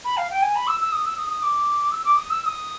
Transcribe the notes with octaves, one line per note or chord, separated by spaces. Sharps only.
B5
F5
G5
G#5
B5
E6
E6
D#6
E6
D#6
D#6
D6
E6
D6
D#6
E6
E6
D#6